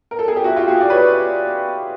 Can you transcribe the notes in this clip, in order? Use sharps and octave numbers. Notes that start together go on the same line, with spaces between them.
A#4
A4
G#4
G4
E4 F#4
F4 G4
F#4 G#4
D5
B4 C#5